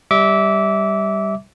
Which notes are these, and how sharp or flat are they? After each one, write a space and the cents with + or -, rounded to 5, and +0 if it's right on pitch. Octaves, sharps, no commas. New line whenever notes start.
G3 +0 E5 -20 D6 -20